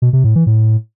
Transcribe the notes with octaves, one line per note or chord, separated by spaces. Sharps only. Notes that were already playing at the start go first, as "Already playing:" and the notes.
B2
C3
A2
E3
A2